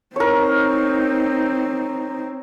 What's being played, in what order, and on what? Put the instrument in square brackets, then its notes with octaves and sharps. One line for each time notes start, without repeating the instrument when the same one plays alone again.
[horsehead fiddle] C4 D#4 [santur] A#4 C#5